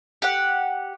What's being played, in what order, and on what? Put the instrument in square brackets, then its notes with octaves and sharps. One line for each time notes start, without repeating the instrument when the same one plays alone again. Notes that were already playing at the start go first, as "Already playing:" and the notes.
[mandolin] G4 F#5